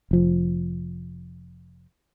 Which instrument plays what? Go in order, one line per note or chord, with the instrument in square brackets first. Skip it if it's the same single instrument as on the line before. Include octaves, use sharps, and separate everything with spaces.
[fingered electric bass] F1 F3